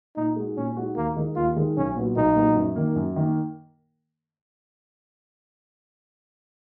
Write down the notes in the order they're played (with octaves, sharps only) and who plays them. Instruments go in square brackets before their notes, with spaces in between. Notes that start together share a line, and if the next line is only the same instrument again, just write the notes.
[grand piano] A#2 [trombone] D#4
[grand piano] G#3 D#4 F#4
[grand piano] A#2 [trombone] C#4
[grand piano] G#3 D#4 F#4
[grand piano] D#2 [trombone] A#3
[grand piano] D#3 G#3 D#4 A#4
[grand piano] D#2 [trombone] F4
[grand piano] D#3 G#3 D#4 A#4
[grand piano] B1 [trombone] C#4
[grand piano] A#2 F#3 B3 F#4
[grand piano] B1 [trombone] D#4
[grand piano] A#2 F#3 B3 F#4
F#2
D#3 A#3
F#2
D#3 A#3